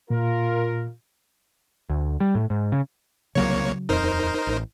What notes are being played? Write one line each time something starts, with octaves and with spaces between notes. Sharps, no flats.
A#2 F4 A#4
D2
G3
A2
G#2
C#3
C2 C#3 F#3 A#3 C#5
D#1 F2 D#4 A#4 C5
A1